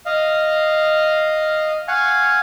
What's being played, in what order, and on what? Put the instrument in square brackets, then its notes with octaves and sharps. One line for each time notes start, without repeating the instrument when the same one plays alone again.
[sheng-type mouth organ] D#5 F5
[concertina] F5 F#5 G#5 [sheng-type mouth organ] C#6